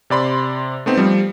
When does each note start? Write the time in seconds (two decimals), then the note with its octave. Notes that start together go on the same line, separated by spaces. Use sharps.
0.10 C3 D5 B5 C6
0.86 A3 B3 C4 D#4
0.97 F3 G3